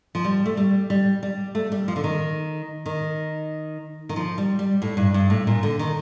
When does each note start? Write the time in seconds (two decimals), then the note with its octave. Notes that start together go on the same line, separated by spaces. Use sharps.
0.15 F3
0.24 G3
0.46 A3
0.57 G3
0.90 G3
1.23 G3
1.55 A3
1.72 G3
1.88 F3
1.96 D3
2.04 D#3
2.86 D#3
4.09 D#3
4.16 F3
4.38 G3
4.59 G3
4.82 A2
4.97 G2
5.14 G2
5.30 A2
5.47 A#2
5.63 D3
5.79 D#3